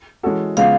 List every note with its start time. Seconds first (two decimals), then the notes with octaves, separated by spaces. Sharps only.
0.23 E3 G#3 C#4 F#4 A4
0.57 C#3 F3 G#3 B3 F5